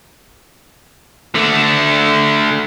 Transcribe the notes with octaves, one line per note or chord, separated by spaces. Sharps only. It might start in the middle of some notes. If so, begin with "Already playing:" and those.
D3 A3